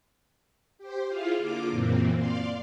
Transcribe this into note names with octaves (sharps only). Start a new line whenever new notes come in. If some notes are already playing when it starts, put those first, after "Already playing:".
G4 C5
E4 F4 G#4 F5
D3 A#3 F4 D6
F#2 A#2 E3 A#3 C4
D5 F5 C6